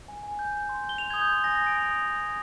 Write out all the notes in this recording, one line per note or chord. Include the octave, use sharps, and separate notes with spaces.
G#5
G#5
G6
G6
C6
G6
G7
C6 F7
G#6
D#6
G6
C6 G#6
G#5 A#6
A#6
D#6
D7
G#5 F7
D#6
G#5
G6